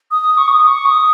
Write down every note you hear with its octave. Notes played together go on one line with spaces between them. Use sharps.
D#6
C#6
D#6
C#6
D#6